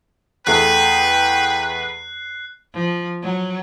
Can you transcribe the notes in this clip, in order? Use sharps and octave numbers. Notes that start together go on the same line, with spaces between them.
E2 A3 G#4 B4 G5 F#6 C7
F3
F#3